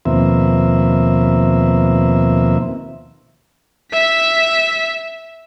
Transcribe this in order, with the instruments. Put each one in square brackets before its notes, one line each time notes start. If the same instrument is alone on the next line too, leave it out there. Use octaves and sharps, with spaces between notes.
[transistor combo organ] D#2 B2 F3 A#3 C4 E5
[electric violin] E5 B6